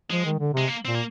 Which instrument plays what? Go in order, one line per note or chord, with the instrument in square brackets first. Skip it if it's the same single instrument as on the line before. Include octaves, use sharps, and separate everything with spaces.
[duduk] F3 [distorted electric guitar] G#3
[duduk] D#3
D3
[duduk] C3 [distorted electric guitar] G#3
[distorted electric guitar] A#3
[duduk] A#2 [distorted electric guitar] C4
[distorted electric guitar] A#3